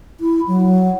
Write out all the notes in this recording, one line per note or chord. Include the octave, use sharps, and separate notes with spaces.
E4
F#3